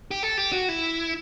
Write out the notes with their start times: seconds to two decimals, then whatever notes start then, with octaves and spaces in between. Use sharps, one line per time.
0.11 G4
0.23 A4
0.38 G4
0.52 F#4
0.69 E4